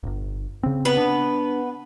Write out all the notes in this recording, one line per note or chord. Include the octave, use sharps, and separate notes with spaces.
D1 G1
C#3 C4
B3 B4
D4